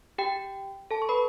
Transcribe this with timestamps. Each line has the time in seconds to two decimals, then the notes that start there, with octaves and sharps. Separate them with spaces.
0.18 G4 G5
0.91 A4 A5
1.02 C#6
1.09 B4 B5